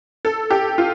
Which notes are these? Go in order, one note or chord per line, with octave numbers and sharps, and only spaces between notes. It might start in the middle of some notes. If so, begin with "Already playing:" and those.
A4
G4
F4